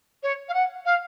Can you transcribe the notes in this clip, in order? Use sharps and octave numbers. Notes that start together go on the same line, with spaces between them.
C#5
F5
F#5
F5